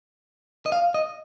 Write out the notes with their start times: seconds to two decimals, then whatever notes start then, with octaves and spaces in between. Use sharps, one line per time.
0.66 D#5
0.72 F5
0.94 D#5